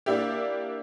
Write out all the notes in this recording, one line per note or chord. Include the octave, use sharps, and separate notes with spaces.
A#3 D4 E4 G4